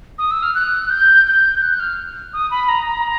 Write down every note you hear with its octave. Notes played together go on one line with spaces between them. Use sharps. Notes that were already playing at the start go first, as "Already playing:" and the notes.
D#6
E6
F6
F#6
G6
G6
F#6
F6
D#6
B5
A#5
A#5